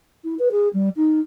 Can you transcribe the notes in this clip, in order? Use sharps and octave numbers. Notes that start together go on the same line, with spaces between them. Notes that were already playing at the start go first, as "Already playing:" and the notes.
E4
B4
G#4
G3
D#4